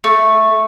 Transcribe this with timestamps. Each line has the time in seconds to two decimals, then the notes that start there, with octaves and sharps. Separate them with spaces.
0.04 A3